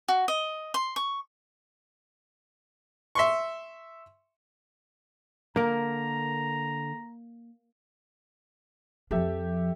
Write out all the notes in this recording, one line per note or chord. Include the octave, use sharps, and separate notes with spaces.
F#4
D#5
C6
C#6
E5 C6 C#6
D3 A#3 A#4 A#5
F2 F3 G4 A4 E5